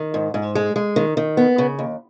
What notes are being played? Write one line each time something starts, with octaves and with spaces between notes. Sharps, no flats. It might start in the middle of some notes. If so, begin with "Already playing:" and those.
Already playing: D#3
G#2
G#2
G#3
G#3
D#3
D#3
B3
C#3
D#2